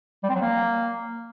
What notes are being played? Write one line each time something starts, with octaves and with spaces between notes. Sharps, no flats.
G3
C4
F#3
A#3